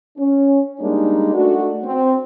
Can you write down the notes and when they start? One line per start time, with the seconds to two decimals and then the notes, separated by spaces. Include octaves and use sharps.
0.17 C#4
0.81 G3 G#3 A#3 D4 D#4
1.34 A3 D4 F#4
1.83 C4